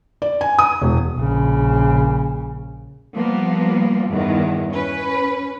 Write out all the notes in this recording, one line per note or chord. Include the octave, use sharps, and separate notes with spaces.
D5
G#5
D#6
E1
A#1 C#3
F3 G3 A#3 B3
E2 G2 D#3
C#4 B4